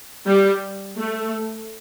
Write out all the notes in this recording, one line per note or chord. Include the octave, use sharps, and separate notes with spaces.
G3
A3